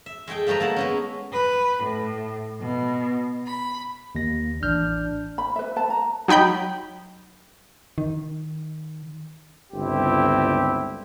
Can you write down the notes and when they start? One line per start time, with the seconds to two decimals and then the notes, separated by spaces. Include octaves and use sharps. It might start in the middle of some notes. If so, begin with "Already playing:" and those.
0.06 E5
0.27 G#3 A3 G#4 G5
0.47 F3 G3 A3 B4 A#5
0.60 G#3 A#3 E4 F#5 A5
0.76 G#3 B3 C#4
1.33 B4
1.83 A2
2.61 B2
3.47 B5
4.15 D#2 A#6
4.63 A1 D4 F6 G6
5.38 B5
5.56 B4 E5
5.76 B4 A5
5.90 A#5
6.28 F#3 D#4 G5 B5 G6
7.98 D#3
9.73 G1 C#2 C4 E4 G4